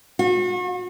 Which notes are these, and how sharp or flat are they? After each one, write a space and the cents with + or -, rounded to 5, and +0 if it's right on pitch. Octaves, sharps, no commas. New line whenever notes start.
F#4 -40